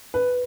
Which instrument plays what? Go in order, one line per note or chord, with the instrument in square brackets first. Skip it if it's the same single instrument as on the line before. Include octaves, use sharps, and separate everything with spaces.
[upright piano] B4